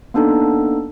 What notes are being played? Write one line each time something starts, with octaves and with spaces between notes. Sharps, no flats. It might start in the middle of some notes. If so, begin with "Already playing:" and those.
A#3 B3 D4 D#4 A4